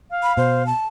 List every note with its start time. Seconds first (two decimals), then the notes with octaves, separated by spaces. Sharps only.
0.11 F5
0.23 B5
0.37 B2 C5
0.66 A5